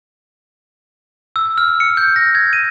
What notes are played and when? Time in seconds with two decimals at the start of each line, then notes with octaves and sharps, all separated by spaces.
1.36 E6
1.58 F6
1.80 C#7
1.97 G6
2.16 A#6
2.35 G#6
2.53 D#7